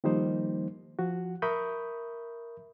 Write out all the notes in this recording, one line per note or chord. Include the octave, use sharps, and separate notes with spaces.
D#3 F3 G3 A#3 D#4 C5
F3 F#4
A#4 E5 B5 C#6 D#6 G6